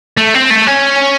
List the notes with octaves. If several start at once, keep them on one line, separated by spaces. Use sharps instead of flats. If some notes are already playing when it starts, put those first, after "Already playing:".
A3
C4
A3
C#4